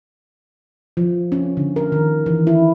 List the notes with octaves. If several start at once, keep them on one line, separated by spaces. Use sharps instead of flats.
F3
C#4
D3
A#4
D#3
E3
E4